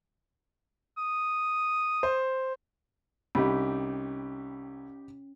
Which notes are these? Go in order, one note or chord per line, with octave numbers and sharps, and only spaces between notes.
D#6
C5
C2 C#4 D#4 G4 B5